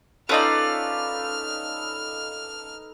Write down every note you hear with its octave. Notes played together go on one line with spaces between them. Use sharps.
C#4 D#4 F4 A4 B4 D5 F6